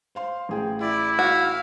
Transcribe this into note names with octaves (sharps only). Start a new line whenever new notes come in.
C5 F5 C6
A1 G#4 G5
E4 D5
F#4 F5